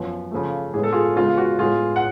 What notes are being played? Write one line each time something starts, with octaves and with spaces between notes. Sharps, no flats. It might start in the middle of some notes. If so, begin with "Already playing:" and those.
Already playing: F#2 F3 B3
C#3 F3 A3
A2 G#3 B3 G#4
A4
F4 G#4
C#3 G#3 B3 F4
F#4
A2 G#3 B3 F4 G#4
F#5